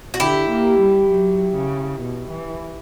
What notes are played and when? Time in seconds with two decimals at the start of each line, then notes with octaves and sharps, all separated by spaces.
0.14 F#4
0.20 D3 E4 G4
0.50 A#3
0.80 G3
1.10 F#3
1.56 C#3
2.01 B2
2.30 E3